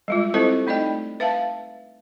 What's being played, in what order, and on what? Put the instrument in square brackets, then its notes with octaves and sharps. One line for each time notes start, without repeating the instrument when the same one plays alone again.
[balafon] G3 G#3 F4
C4 E4 G4 A4 C5 D#5
A3 D#4 D5 D#5 G5
B4 E5 F5 A5